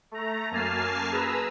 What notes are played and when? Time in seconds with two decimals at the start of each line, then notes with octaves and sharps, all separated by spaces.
0.12 A3 A#5
0.51 F#2 A#3 G#5 A5 F6 C7
1.12 G#4 B4 A#5 E6